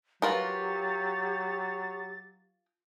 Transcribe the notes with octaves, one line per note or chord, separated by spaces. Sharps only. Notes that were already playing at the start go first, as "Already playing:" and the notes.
F#3 F4 G4 A#4 B4 A6